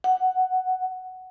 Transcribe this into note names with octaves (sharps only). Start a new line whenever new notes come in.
F#5